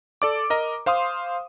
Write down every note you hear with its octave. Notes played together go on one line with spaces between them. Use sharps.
A4 D5 D6
A#4 D#5 A#5
C5 F5 C6 D#6